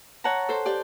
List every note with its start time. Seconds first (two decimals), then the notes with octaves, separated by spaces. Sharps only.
0.24 C#5 F#5 A5 A#5
0.49 A4 C5
0.65 G4 D5 G5